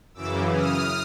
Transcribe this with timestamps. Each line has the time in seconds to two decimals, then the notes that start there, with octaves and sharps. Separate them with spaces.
0.14 F#2 C#3 E3 D6 E6
0.52 D#6 F6